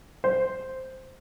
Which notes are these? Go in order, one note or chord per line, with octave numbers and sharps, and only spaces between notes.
C5